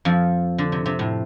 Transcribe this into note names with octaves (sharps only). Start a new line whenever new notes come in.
F2 F3
D3
C3
C3
A2